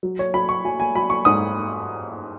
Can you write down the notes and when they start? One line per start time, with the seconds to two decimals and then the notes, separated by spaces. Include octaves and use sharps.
0.03 F#3
0.19 C#5
0.34 F#3 B5
0.49 C#6
0.64 F#3 G#5
0.80 G#5
0.95 F#3 B5
1.10 C#6
1.25 G#2 D#6